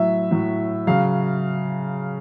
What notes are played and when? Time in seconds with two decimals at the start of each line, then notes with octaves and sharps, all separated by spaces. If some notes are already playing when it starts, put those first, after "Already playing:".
Already playing: A2 F#3 E5
0.31 A2 F#3
0.87 C#3 F#3 F5